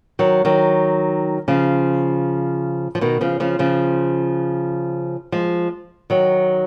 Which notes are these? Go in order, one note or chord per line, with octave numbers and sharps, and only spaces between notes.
D#3 F#3
D#3 F#3
C#3 F3
F3
B2 D#3
C#3 F3
C#3 F3
C#3 F3
F3 G#3
D#3 F#3